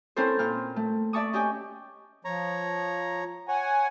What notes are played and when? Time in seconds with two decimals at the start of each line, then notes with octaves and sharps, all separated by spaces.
0.16 C4 C#4 E4 A4 A#4 C5
0.39 A#2 C4 F6
0.76 A3
1.13 D5 E5 A5 C#6 D#6
1.33 C#4 G4 D#5 G#5
2.25 F3 C#5 A#5
3.48 C#5 F#5 G#5